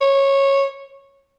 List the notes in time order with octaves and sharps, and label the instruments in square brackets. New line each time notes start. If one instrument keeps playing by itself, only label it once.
[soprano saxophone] C#5